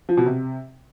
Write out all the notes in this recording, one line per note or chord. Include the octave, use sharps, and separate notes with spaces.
F3
B2
C3